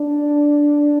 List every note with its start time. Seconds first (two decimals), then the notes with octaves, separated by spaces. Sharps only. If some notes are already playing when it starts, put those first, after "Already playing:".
Already playing: D4